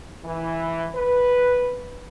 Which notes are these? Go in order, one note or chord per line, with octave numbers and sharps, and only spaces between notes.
E3
B4